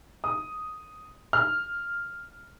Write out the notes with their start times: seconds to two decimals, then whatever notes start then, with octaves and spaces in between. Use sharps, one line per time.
0.24 D#6
1.33 F6